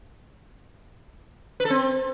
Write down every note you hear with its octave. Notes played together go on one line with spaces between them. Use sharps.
B4
A4
C4